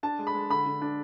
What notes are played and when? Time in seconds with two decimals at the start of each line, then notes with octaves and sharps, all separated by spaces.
0.03 D4 A5
0.19 G#3
0.27 B5
0.34 G#3
0.50 D3 B5
0.66 D3
0.82 D4